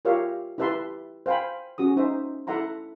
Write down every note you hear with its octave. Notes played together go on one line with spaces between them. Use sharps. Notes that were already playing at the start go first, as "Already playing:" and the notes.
F4 G4 A#4 C#5 E5 F5
E4 G4 B4 E5 A5 C6
C5 F5 G5 G#5 B5
C#4 F#4 G#4 D#6
D#4 C5 E5
E4 A4 E5 F#5 A#5 C6